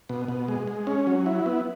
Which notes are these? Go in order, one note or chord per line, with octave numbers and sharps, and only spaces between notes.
B2
B2
G#3
G#3
C#4
F#3
E4
B3